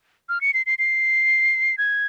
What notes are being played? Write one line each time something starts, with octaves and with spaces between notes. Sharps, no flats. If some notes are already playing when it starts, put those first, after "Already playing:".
F6
C#7
C7
C7
C7
G#6